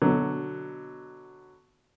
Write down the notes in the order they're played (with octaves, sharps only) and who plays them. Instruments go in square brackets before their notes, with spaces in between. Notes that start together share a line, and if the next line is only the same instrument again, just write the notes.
[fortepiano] B2 D3 F#3